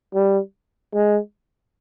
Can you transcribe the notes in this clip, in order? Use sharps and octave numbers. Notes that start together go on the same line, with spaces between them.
G3
G#3